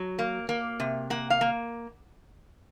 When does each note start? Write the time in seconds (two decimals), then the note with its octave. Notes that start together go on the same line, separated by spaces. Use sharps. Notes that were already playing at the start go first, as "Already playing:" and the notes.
Already playing: F#3
0.19 A#3
0.49 A#3
0.80 C3
1.10 A#3 F#5
1.30 F5
1.41 A#3